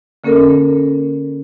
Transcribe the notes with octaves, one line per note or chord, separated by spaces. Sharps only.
D3 A#3 C#4 A4 A#4